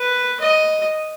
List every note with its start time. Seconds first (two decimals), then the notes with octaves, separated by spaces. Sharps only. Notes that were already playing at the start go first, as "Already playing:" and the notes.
Already playing: B4
0.41 D#5